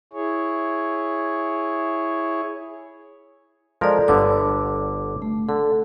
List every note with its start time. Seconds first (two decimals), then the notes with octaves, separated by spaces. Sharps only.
0.13 E4 G#4 C#5
3.81 F3 G#3 A4 A#4 D5
4.08 G1 D3 B3 D6
5.22 A3
5.49 D3 A4